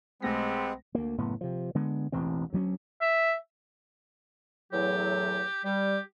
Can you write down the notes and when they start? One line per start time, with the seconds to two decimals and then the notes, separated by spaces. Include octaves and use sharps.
0.22 B1 G#3 A3 B3 C4 G4 A4 A#6
0.95 D2 A#3
1.18 F#1 A2 B3
1.41 C3 F3
1.75 D3 G#3 B3
2.12 E1 A1 E3 C4
2.53 D2 F#3 C4 C#4
3.01 E5
4.73 E2 A2 F#3 G4
5.64 G3 G4